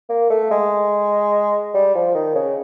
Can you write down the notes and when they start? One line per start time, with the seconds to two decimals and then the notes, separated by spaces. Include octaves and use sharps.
0.09 A#3
0.30 A3
0.51 G#3
1.75 G3
1.95 F3
2.15 D#3
2.35 C#3